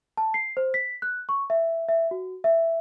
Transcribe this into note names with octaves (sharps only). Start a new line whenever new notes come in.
A5
C7
C5
B6
F#6
C#6
E5
E5
F#4
E5